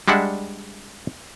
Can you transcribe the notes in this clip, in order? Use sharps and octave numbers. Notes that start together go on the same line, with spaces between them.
G3 G#3 D4 E5 F#5